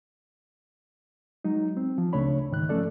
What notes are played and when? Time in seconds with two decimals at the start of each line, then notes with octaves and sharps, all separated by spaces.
1.45 F#3 G#3 D#4
1.77 C4
1.98 F3
2.13 C#2 C#3 A3 D4 C#5 B5
2.51 G#2 D#3 F#6
2.69 F3 A3 C#4 A4 D5